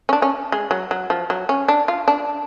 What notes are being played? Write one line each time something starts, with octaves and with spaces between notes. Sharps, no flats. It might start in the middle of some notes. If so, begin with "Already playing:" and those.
C#4
D4
C#4
G#3
F#3
F#3
F3
F#3
C#4
D4
F4
D4